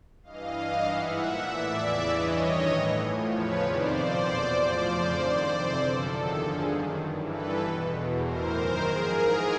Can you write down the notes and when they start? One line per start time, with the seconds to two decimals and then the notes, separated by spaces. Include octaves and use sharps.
0.23 G2 E3 D#5 F5
0.54 G2 E3
0.84 G#2 E3 E5 F#5
1.15 A#2 F3 E5 F#5
1.46 A2 E3 D5 E5
1.77 E2 C#3 E3
2.07 G2 E3 C#5 D#5
2.38 G2 D#3
2.69 A2 E3
2.99 A2 F3
3.29 E2 C#3 F3 B4 C#5
3.61 F2 C3 D#3 C5 D5
3.91 A#2 F3
4.22 E2 B2
4.53 A2 F3 C5 D5
4.84 F2 C#3 F3
5.14 G2 D#3
5.45 F2 C3 E3
5.75 F#2 D3 F3 A4
6.05 E2 C3 D#3
6.37 G2 D3 F3 G#4
6.67 F#2 D#3
6.97 G2 E3
7.28 G2 E3 A4 B4
7.59 E2 B2
7.89 E2 B2
8.20 A2 E3 A#4 C5
8.51 F#2 D#3
8.81 G#2 F3 G#4 A#4
9.12 G#2 E3